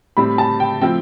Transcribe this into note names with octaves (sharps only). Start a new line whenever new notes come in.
A2 G3 C4 B5
A5
G5
F3 A3 C4 G5